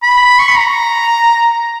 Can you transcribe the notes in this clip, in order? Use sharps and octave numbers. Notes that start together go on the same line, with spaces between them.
B5
C#6
B5
A#5